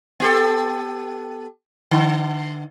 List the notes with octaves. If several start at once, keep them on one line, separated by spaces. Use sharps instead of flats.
B3 G4 A4
D3